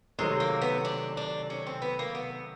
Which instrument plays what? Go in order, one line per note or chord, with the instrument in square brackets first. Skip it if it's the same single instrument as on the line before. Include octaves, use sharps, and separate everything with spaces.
[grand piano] C3 D#3 F#3 A3 C4 [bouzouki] G#3
[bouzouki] A#3
B3
D4
D4
C#4
C4
B3
A#3
B3